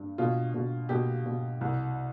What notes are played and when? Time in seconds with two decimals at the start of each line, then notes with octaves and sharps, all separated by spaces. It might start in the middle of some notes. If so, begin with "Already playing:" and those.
Already playing: G2
0.18 B2 F4
0.54 B2
0.89 B2 G4
1.26 B2
1.61 C2